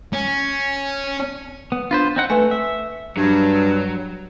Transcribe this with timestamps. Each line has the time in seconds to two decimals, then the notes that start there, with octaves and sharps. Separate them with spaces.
0.13 C#4
1.72 B3
1.91 D4 F4 B4 C5
2.16 C4 D#4 F#5
2.30 A3 B4 G#5
2.51 E5
3.17 G2 F#3